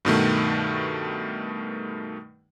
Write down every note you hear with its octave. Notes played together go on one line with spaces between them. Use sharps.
G2 B2 D#3 A3